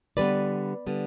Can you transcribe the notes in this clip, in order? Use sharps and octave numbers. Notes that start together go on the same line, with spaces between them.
D3 G3 B3 B4 D5
D3 G3 B3